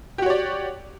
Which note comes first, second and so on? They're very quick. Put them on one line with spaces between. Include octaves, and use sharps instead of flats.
G4 F#4 C#5 D5